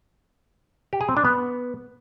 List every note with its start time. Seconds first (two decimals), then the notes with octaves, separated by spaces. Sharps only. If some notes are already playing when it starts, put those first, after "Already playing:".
0.93 G4
1.01 G#4
1.09 C4
1.17 D4
1.25 B3